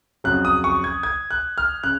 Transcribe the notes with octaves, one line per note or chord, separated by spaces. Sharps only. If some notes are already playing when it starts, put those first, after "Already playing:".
F2 C#3 F#3 F#6
D#6
C#6
G#6
G#6
F#6
F6
C#3 F#6